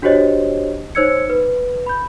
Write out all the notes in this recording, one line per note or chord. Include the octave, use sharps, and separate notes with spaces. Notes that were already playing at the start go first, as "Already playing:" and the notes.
D4 F#4 G4 C5 C#5 D#5
D#4 C5 C#5 E6 G#6 C#7
B4
B5 G6